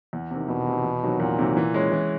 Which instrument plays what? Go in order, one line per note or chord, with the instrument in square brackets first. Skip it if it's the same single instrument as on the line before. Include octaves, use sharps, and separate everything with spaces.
[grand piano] E2
C3 D#3
[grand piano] E2 [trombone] B2
[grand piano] C3 D#3
E2
C3 D#3 F#3
[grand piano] E2 [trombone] A#2
[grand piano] C3 D#3 F#3
E3
G#3 C#4
E3